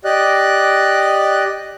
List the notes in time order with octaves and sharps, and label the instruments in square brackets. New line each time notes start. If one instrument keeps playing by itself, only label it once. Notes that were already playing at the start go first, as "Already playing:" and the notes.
[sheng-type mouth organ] G4 D5 D#5 F#6